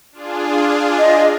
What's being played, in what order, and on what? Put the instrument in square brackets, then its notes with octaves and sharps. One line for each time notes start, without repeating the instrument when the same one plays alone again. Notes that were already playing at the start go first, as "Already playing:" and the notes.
[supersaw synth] D4 F4 G#4
[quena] D#5